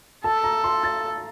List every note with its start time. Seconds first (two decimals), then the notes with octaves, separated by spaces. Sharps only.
0.24 A4 A5
0.44 A#5
0.64 C6
0.83 A6